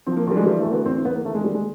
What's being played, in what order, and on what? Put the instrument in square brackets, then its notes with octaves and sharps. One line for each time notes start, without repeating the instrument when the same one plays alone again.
[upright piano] F3 C4
A#3
D2 G3
G#3
E3 G3
A3
D2 A#3
B3
E2 C4
C4
E2 B3
A#3
D#2 A3
G#3
D#2 G3
G#3